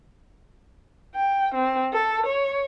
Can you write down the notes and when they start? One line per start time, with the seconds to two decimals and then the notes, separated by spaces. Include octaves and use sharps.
1.15 G5
1.55 C4
1.94 A4
2.26 C#5